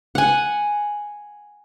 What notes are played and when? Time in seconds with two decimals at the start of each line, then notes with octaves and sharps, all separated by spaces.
0.15 F#5 G#5